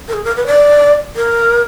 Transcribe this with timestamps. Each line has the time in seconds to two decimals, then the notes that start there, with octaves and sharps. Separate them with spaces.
0.08 A#4
0.14 G#4
0.24 A#4
0.37 B4
0.47 D5
1.16 A#4